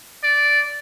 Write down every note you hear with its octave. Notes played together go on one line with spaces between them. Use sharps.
D5